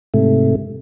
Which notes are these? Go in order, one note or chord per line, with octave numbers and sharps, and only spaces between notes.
G#2 C3 A3